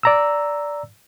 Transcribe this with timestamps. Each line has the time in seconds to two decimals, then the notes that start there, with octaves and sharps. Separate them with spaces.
0.03 D5 A#5 E6